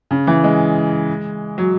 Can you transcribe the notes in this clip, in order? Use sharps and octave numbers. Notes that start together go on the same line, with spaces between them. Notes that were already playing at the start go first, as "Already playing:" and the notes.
C#3
E3
G#3
F#3